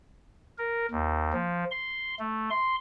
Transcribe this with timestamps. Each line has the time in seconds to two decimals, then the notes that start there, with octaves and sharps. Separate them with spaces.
0.58 A#4
0.91 D#2
1.33 F3
1.71 C6
2.19 A3
2.50 C6